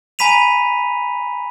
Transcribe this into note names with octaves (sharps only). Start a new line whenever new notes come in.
G#5 A#5 B5 B6 D#7 F7